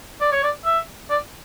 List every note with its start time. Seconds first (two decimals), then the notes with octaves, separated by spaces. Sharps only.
0.21 D5
0.32 C#5
0.43 D5
0.65 E5
1.10 D5